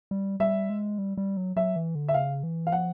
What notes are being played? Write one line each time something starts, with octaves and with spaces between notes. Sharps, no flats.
G3
G3 E5
G#3
G3
G3
F#3
F#3 E5
E3
D3
E5
C#3 F5
E3
F5
F3 F#5